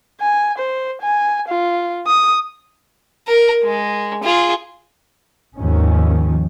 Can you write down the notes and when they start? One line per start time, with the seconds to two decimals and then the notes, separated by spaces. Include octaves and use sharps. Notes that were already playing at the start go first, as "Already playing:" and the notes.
0.21 G#5
0.58 C5
1.02 G#5
1.49 F4
2.07 D#6
3.27 A#4
3.63 G#3
4.23 F4 G#4
5.57 D#2 G#2 D#3 F3 C#4